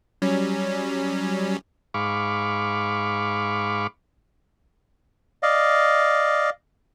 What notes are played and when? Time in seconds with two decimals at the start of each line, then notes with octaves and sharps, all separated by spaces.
0.22 F#3 G3 C#4
1.94 G#2 F5 B5 C#6 D6
5.43 D5 D#5 F5